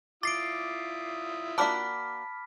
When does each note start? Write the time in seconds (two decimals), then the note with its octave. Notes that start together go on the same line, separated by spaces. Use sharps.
0.23 E4 F4 D6 D#6 A6 C7 D7
1.58 A#3 D4 F#4 A5 B5 D6 F6 B6